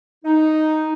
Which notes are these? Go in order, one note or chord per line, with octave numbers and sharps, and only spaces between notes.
D#4